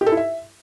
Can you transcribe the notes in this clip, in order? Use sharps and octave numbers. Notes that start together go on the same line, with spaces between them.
G4
A4
E4
E5